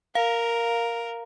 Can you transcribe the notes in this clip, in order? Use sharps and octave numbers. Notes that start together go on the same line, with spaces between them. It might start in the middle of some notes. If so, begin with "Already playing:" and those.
A#4 F5